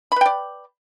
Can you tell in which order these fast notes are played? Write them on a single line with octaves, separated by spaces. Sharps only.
B5 B4 G5 D5